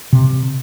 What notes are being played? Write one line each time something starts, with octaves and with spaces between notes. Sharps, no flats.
C3